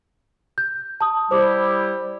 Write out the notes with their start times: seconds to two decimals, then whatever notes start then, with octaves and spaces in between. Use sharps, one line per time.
0.58 G6
1.01 A5 D#6
1.31 G3 E4 G4 C5 D6